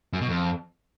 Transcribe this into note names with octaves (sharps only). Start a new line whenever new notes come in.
F#2
B2
F2